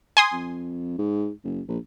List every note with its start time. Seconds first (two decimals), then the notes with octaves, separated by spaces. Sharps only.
0.17 G#5 C6 D#6
0.32 F2
0.98 G#2
1.44 F#1
1.68 A#1